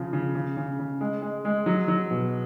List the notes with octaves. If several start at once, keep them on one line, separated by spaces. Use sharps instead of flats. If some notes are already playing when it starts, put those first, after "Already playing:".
Already playing: C#3 F3
C#3
C#3
C#3
C#3
G#3
G#3
G#3
F#3
F#3
B2